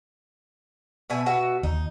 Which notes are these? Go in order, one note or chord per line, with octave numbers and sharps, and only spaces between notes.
B2 E5 G#5
B2 F#4 E5
D#2 D#4